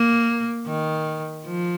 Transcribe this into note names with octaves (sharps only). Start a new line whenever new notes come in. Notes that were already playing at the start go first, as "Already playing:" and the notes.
Already playing: A#3
D#3
F3